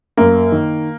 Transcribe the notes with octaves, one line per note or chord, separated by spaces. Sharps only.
F#2 A#3
D#3